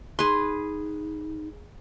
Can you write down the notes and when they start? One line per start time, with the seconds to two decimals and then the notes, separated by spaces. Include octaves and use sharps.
0.19 D#4 G#4 B4 C6